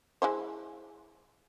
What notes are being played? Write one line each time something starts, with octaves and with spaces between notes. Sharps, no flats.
G#3 E4 C5